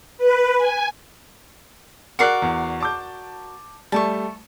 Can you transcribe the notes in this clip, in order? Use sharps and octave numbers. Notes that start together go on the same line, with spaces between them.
B4
G#5
F#4 A#4 D5 F#6 C7 C#7
E2
A5 D6 G6
G3 A3 A5 C#6